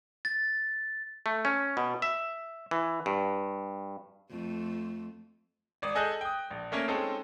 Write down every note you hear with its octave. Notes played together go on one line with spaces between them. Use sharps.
A6
A3
C#4
B2
E5
E3
G2
F2 A3
G#1 D5 D#6
G#4 A4 D#5 G#5 F#6 G6
G5 D#6
A#1
A3 A#3 C#4 A#4
G#3 C4 C#4 D#4 A4